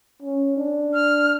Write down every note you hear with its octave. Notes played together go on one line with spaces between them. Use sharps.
C#4
D4
F6